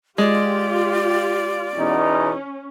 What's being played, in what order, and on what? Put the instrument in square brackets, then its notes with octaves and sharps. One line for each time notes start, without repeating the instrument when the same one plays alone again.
[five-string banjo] G#3 [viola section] F4 G4 [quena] D5
[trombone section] E2 B2 D#4 [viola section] C#4